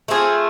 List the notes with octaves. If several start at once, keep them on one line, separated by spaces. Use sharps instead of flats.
A3 C4 F4 G#4